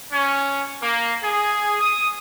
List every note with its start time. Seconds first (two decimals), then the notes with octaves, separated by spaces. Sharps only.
0.12 C#4
0.81 A#3
1.21 G#4
1.81 D#6